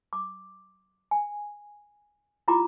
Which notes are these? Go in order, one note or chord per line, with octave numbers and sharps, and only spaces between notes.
D6
G#5
E4 F4 G4 A#5 B5 D6